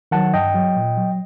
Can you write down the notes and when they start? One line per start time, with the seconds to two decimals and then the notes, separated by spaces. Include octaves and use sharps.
0.11 D#3 F#3 F#5 A5
0.34 G2 D#5 G5
0.55 F#3
0.76 A#2
0.97 F#3